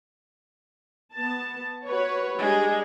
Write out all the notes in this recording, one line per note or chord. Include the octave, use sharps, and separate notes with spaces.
B3 A5
F#4 B4 C#5
G3 G#3 D4